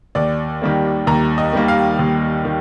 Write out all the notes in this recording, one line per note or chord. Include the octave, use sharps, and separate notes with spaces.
D#2 D5
D#3 G3 A#3
D#2 A#5
D#5
D#3 G3 A#3
F5
D#2
D#3